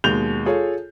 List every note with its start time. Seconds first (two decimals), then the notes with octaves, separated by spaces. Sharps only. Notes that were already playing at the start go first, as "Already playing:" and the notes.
0.04 D#2 B2 G#3 G6 F7 G7
0.46 F4 G#4 A4 C#5